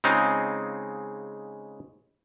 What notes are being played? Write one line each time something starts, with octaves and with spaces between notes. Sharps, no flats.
C#3 G#3 C4 D#4 F4